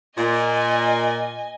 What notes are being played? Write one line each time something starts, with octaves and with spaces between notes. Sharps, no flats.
A#2 D#5 G#5